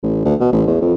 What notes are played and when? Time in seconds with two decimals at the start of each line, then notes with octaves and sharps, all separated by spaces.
0.03 A1
0.25 D2
0.40 B2
0.53 A1
0.68 E2
0.82 F2